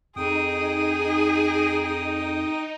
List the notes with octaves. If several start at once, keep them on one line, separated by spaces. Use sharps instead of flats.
F2 D#4 G#4 G5 D#6